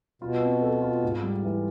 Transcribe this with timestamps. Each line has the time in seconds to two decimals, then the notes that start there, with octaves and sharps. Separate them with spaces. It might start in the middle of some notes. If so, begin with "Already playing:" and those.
0.22 B2 F4
0.42 C4
0.62 A4
0.82 F4
1.04 G#2
1.23 G3
1.43 E3